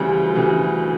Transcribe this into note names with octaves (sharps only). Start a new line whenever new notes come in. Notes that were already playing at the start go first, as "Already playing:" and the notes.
Already playing: D2 C#3 E3 G3
D2 C#3 E3 G3